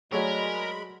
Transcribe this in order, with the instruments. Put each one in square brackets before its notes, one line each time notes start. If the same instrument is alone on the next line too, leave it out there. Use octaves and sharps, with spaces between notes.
[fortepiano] F#3 A3 [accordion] G#3 B5 [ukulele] G#4 C#5 D5 [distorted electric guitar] A#4